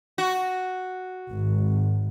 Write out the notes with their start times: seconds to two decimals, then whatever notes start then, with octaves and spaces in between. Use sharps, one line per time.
0.18 F#4
1.32 G#1